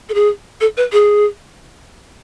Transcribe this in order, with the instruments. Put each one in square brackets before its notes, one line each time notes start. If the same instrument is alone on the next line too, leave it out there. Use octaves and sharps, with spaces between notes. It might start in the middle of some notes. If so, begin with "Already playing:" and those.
[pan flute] A4
G#4
A4
B4
G#4